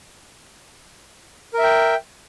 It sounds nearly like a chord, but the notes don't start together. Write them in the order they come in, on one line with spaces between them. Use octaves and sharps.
A#4 E5 G5